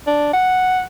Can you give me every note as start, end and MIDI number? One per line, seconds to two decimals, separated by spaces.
0.07 0.32 62
0.33 0.82 78